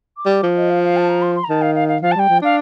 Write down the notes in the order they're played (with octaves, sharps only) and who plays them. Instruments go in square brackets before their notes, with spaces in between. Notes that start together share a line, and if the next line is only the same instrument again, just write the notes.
[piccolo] D6
[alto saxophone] G3
F3
[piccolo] D#5
F5
F5
A5
A#5
C6
C6
A#5
[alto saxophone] D#3 [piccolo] A5
[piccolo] F5
F5
F5
[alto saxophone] F3 [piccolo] F5
[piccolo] A5
[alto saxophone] G3 [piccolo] G5
[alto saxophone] F3
[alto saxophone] D4 [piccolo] F5